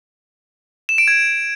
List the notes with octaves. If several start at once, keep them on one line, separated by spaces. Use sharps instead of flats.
E7
D7
G#6